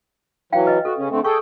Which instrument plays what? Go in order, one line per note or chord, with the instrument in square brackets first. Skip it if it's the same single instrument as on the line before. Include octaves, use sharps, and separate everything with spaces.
[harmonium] E3 F#3 [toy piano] F5 G5
[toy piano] B4 D#5
[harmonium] F#4 [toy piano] A4
[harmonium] C#3 C#4
D3 A3 C4
[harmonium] G#4 A4 G5 [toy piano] C#6